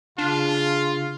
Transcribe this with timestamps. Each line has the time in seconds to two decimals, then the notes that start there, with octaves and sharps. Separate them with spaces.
0.18 C#3 D4 F4